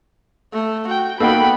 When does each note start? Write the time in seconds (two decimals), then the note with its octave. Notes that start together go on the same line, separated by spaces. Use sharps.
0.54 A3
0.89 F#4 G5
1.20 A#3 B3 D#4 F#4 A4 G5 B5